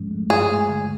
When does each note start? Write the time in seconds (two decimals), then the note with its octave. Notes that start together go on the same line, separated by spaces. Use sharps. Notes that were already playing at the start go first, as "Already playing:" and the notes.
Already playing: G#2 F3 G#3 C#4
0.11 A3
0.30 G2 G#4
0.50 G#3
0.69 D3